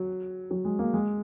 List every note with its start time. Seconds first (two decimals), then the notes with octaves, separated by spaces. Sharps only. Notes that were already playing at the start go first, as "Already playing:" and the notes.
Already playing: F#3
0.51 F#3
0.65 G#3
0.79 A#3
0.93 G#3